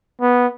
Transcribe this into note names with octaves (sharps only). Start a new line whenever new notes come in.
B3